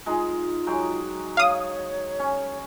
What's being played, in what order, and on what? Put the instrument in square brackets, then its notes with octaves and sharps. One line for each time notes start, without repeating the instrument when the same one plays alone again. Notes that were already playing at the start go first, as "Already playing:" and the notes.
[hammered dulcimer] G#3 D#4 [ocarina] F4
[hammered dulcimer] F#3 G#3 G5
[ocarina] C#5 [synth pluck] F5 D#6
[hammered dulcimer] C#4